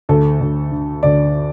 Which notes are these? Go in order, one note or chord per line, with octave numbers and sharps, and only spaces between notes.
D2 A4
D2
D3
D2 D5